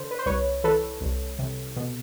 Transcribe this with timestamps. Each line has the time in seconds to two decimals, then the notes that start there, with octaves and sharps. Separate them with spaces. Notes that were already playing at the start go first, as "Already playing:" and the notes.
Already playing: D3 C5
0.11 B4
0.19 C5
0.26 C2 B4 C#5
0.64 E3 A4 B4
1.01 C2
1.39 C3
1.76 B2